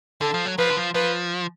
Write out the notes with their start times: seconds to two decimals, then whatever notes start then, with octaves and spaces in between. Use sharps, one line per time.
0.21 D3 A4
0.34 F3
0.45 F#3
0.58 F3 B4
0.70 D3
0.77 F3
0.94 F3 B4